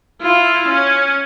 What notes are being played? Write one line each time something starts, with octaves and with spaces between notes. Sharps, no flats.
E4 F4
C#4